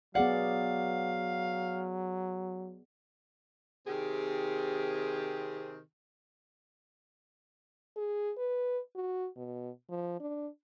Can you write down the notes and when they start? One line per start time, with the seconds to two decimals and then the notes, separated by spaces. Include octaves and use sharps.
0.15 F#3 B3 G#4 D5 F5 F#5
3.87 C3 D#3 C4 G4 G#4
7.97 G#4
8.38 B4
8.95 F#4
9.37 B2
9.89 F3
10.20 D4